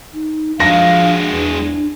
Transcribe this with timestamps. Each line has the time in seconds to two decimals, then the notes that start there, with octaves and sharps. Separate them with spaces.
0.13 D#4
0.60 F3 G#3 D4 F#4 F5 A#6
1.32 E2